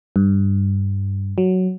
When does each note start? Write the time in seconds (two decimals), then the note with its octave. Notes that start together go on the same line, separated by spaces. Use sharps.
0.16 G2
1.38 F#3